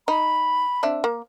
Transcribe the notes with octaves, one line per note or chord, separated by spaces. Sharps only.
D#4 B5
C4 D4 E5
A#3